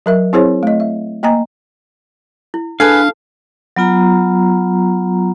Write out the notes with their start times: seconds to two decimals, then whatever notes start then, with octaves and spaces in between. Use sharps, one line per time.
0.06 F#3 A#4 E5
0.33 C4 E4 G#4 C5 C#5
0.63 A3 D#5
0.80 E5
1.23 A#3 D#5 G#5 A#5
2.54 E4
2.80 D4 G#4 A4 B4 F5 G#5 A5
3.76 F#3 B3 F4 A#5